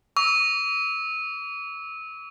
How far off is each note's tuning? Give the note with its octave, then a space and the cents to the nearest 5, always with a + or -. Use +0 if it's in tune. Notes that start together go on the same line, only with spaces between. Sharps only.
C#6 +45 E6 -30